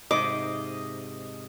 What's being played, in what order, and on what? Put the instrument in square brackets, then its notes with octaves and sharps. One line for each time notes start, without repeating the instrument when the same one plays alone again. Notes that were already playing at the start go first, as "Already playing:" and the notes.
[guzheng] G#2 C3 [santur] D#5 [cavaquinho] D6